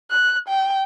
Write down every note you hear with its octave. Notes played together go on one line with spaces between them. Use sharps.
F#6
G5